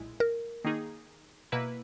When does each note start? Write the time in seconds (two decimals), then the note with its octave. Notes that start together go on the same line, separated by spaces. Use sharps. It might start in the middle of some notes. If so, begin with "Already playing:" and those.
Already playing: B1 A#2 G#3 E4
0.20 A#4
0.64 D#3 A#3 D#4 G#4
1.52 B2 A#3 E4 B4